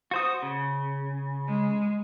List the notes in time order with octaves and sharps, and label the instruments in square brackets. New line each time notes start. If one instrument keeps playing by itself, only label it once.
[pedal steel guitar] F#4 C5 D#6
C#3
[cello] G#3